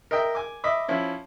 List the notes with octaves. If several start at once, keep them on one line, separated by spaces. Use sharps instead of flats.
A#4 D#5 E5 G5
G#5 D6
D#5 E5 B5 D6
F3 C#4 E4